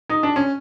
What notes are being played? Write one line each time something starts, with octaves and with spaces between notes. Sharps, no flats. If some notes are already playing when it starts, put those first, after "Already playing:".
D#4
D4
C#4